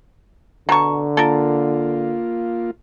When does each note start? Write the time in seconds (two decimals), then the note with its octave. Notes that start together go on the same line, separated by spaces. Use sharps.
0.69 B2 D3 A5 A#5 C#6
1.17 A#3 F4 A4 A#4